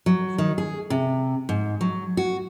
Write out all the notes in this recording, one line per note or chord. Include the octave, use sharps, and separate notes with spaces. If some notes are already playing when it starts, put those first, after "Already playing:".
F#3
D#3
G#4
C3
G#2
F#3
F#4